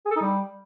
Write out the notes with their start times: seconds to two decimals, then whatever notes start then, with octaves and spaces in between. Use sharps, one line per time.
0.06 G#4
0.11 A4
0.16 D#4
0.21 G3